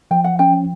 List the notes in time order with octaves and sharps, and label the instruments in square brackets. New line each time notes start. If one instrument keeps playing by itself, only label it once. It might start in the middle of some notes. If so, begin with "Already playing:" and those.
[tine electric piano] F3 [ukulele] G5
[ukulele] F#5
[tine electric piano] C#4 [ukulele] G5